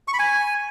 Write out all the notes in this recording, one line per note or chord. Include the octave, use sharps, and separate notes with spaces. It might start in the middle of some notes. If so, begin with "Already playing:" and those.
C#6
B5
G#5